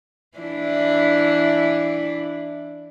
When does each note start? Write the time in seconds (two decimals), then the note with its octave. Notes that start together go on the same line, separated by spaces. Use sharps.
0.38 E3 D4 E4